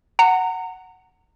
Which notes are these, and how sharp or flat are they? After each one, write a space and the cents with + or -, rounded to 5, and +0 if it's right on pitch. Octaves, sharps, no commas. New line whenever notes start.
F#5 +5 A#5 -25